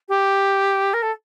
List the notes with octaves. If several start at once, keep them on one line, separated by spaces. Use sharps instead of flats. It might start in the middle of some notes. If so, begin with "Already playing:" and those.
G4
A#4
A4